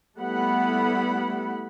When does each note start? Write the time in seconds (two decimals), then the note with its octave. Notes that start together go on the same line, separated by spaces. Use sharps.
0.17 G3 A3 B3 E4 F#5 B5